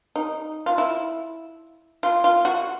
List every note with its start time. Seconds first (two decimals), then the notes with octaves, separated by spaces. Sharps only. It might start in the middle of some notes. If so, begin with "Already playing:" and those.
0.16 D#4
0.66 F4
0.78 E4
2.03 F4
2.24 F4
2.45 F#4